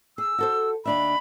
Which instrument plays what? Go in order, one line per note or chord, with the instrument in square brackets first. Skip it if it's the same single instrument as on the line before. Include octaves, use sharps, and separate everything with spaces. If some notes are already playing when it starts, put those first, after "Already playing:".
[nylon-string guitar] G#4 [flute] E6
[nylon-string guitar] F#4 A4 C5
[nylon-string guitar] D#2 D4 E5 [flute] B5